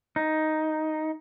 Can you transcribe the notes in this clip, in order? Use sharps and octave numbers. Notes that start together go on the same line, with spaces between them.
D#4